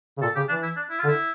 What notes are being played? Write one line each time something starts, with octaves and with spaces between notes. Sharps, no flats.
C#3
A#2 A4
C#3 G4
E3 D4
E4
D4
E4
F4
D3
E4